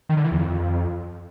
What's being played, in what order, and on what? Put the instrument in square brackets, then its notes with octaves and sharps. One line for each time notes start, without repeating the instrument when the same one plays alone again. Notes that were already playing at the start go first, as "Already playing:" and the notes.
[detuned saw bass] D#3
D3
E3
E2
F2